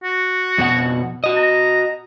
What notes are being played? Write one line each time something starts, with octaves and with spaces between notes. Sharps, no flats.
F#4
F2 B2 F#5
F#4 D#5
A#5